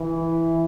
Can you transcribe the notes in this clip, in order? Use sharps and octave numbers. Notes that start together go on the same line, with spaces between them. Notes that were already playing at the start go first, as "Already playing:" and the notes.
Already playing: E3